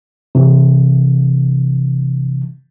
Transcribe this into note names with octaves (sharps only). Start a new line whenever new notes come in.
C3 E3